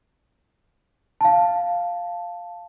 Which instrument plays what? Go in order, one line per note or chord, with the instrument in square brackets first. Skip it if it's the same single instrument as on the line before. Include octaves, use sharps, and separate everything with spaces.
[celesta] F5 A5